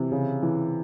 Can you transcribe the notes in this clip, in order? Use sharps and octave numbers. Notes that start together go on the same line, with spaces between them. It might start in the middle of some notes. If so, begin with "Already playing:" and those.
Already playing: C3 E3
C#3
E3